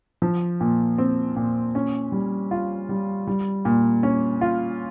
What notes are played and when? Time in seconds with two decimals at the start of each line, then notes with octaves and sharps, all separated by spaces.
0.22 F3
0.60 A#2
0.98 C4
1.36 A#2
1.75 C#4
2.12 G3
2.51 F4
2.89 G3
3.27 G3
3.65 A#2
4.03 C#4
4.41 F4